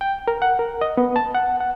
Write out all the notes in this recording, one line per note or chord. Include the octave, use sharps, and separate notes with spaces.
G5
A#4
F#5
A#4
D#5
B3
A5
F#5
F#5